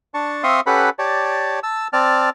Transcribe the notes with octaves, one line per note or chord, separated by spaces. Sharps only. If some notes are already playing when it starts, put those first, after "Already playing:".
D4 A5 C#6
C4 E5 F5 C6 C#6 D#6
C#4 G4 A4 B4 F#5 B5
G4 C#5 D5 A5
A5 E6
C4 D5 A5 F6